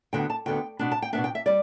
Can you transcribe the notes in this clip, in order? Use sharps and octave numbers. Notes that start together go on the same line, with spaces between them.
D2 D3 B3 G5
A5
D2 D3 B3 G5
B2 B3 D4
A5
G5
B2 B3 D4 E5
G5
E5
G3 D5